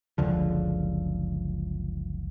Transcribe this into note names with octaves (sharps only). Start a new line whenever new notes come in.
F#1 C#2 D3 F3